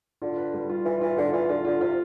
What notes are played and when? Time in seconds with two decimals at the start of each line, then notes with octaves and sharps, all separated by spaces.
0.22 D3 F4
0.38 B4
0.54 G3
0.70 F4
0.85 E3 F4
1.01 E3 F4
1.17 D3 F4
1.33 E3 F4
1.49 D3 F4
1.65 D3 F4
1.81 C3 F4